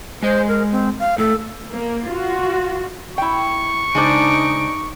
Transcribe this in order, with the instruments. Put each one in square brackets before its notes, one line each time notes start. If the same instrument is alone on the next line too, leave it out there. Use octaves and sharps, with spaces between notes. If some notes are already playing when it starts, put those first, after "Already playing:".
[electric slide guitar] G#3 D#5 [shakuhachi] C5
[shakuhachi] A#4
C4
F5
[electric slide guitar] A2 A3 [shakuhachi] A4
[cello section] A#3
F4 F#4
[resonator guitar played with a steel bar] E4 G5 [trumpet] C#6
[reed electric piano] C#3 D6 [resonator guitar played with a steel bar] G#3 D4 C5 [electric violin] D#4 D7